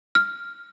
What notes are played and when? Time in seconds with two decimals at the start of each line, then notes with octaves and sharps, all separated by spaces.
0.15 F6